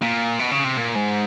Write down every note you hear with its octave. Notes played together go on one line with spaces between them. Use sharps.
A#2
B2
C#3
C3
A#2
G#2